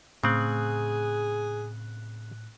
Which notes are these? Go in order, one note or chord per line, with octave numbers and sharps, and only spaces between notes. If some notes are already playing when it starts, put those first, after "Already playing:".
A2 C#3 C4 G#4 F#6